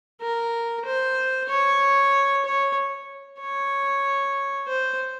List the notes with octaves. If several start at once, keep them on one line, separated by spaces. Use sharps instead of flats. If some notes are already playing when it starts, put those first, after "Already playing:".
A#4
C5
C#5
C#5
C#5
C5